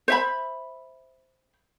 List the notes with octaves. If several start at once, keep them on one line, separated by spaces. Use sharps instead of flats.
C5 E5 B5